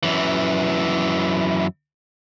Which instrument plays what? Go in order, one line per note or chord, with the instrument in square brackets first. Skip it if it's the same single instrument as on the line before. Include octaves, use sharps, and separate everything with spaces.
[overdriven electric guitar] F#2 E3